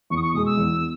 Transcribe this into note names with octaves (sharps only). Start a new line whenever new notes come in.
E2 C#6
D#6
C#6
B2 G#3 D#6
E6
E2